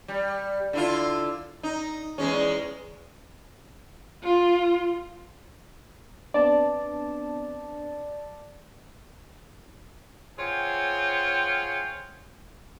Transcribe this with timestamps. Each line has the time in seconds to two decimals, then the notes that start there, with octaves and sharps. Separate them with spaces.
0.08 G3
0.73 D3 E4 F4
1.63 D#4
2.18 E2 G#3 C#4
4.23 F4
6.34 B3 C4 D4 D5 A5
10.38 C4 F4 G#4 C#5 F#5 G5